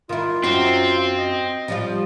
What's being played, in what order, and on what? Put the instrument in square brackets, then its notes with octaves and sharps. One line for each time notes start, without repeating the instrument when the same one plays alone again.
[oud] D#3 E4 [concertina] F4
[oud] F#2 D#4 F#4 [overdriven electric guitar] C4
[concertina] D#5
[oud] F3 G3 F4